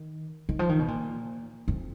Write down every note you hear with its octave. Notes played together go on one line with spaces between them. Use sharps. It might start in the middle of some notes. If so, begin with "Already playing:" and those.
Already playing: D#3
D#3
F3
D#3
B2
A#2
F2